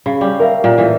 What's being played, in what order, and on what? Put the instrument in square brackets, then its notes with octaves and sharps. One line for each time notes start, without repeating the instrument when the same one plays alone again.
[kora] C#3 [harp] B5
[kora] G3 C#4
[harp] A#4 E5 F5
[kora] A#2
A2 E3